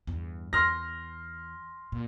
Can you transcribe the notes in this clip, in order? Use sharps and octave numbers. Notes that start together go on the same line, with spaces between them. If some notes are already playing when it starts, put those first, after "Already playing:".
E2 G2
E2 C6 F6 A#6
A#2